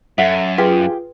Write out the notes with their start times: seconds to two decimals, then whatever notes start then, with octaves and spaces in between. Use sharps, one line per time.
0.18 F#2 A4 C#5 E5 F#5
0.58 F4 G4 G#4 B4